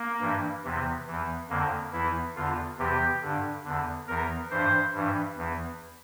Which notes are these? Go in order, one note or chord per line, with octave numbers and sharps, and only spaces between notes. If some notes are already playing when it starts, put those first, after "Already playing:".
Already playing: A#3
G2 E3
E2 C3 E3
E2 E3
F2 D3 A#3
E2 E3 E4
E2 D3 F4
E2 C3 E3 G4
G2 D3
E2 D3
E2 E3 A#4
G2 E3 C5
G2 E3
E2 E3